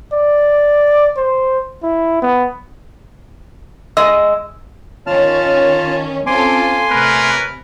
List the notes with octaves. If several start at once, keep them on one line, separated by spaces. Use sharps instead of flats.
D5
C5
E4
B3
G#3 D#5 E6
D#3 C#4 F4 C#5 A5 F6
C4 C#4 F4 A4 C5 G#5 C6 D6
C3 A3 C#4 A#4 B4